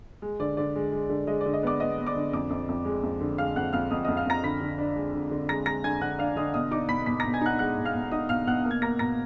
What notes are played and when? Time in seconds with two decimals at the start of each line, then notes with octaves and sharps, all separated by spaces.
0.22 G#3
0.40 D3 D5
0.57 D3 D5
0.76 G#3
0.92 G#3
1.09 D3
1.27 G#3 D#5
1.41 D5
1.46 D3
1.54 D#5
1.63 B3 D5 D6
1.80 B3 D#5 D#6
1.98 B3
2.06 D5 D6
2.16 D3
2.33 F2 D5 D6
2.50 F2
2.69 F2
2.85 G#3
3.03 F2
3.21 D3
3.38 G#3 F5 F6
3.56 F2 F#5 F#6
3.73 F2 F5 F6
3.91 F2 D#5 D#6
4.05 F2 D#5 D#6
4.17 F5 F6
4.26 F2 A#5 A#6
4.44 D3 B5 B6
4.61 D3
4.78 D4
4.96 G#3
5.14 D3
5.31 D3
5.49 G#3 A#5 A#6
5.66 G#3 A#5 A#6
5.84 D3 G#5 G#6
6.01 D3 F#5 F#6
6.19 D4 F5 F6
6.36 D3 D#5 D#6
6.54 B2 D#5 D#6
6.71 D#4 D5 D6
6.89 B2 B5 B6
7.06 B2 B5 B6
7.20 A#5 A#6
7.25 B2
7.34 G#5 G#6
7.41 D#4 F#5 F#6
7.59 G#3 F#5 F#6
7.77 B2
7.85 F5 F6
7.95 B2
8.12 D#4 D#5 D#6
8.29 B2 F5 F6
8.47 B2 F#5 F#6
8.65 A#3
8.71 G#6
8.82 A#3 A#5 A#6
8.99 B2 A#5 A#6